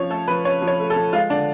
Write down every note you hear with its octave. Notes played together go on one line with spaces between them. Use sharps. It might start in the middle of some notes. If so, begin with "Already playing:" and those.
Already playing: F3 C#4 C#5
A3 A4
F3 B4
C#4 C#5
F3
C#5
A3
A4
F3
G#3 F4
D3 D4